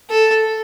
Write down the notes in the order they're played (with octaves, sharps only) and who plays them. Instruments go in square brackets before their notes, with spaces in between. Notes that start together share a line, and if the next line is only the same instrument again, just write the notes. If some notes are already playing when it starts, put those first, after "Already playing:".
[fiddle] A4